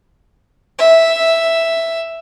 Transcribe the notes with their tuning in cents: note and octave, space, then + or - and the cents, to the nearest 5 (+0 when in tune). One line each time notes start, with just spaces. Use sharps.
E5 +0